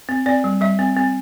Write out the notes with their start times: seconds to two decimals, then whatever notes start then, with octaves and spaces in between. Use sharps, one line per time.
0.09 C4
0.26 C4 D5
0.44 G3
0.61 G3 E5
0.79 C4
0.96 C4